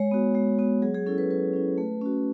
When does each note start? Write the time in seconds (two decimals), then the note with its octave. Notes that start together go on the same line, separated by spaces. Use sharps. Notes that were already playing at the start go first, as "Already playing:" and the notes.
Already playing: G#3 C#5
0.11 B3 F#4
0.35 G#3
0.59 B3 F#4
0.82 F#3 G#4
0.94 G#4
1.06 C#4 E4 A4
1.18 B4
1.30 F#3 B4
1.54 C#4 E4
1.78 A3
2.01 C#4 F#4